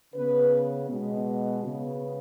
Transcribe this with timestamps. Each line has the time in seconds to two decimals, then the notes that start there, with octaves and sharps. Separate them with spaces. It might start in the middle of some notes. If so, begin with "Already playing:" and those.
0.14 C#3 B3 B4
0.88 B2 G#3 B3
1.62 C#3 B3